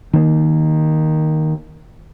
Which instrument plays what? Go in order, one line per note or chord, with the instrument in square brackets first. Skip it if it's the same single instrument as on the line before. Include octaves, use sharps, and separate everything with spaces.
[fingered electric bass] D#3 A#3